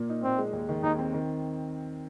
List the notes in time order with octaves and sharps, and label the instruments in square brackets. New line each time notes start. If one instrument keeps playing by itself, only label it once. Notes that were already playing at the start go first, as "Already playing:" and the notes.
Already playing: [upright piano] A#2 A#3
D#4
[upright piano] A#2 [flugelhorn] C4
[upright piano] G#3
D#2
D#3
[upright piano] D#2 [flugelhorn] D#4
[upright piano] C4
D#3